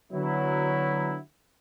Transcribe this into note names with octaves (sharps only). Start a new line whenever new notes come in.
D3 F#3 B3 E4